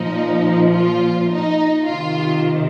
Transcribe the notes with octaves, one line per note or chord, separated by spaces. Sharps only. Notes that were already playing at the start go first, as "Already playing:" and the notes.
Already playing: A#2 F3 D#4
F4
D#4
C3 D#3 F4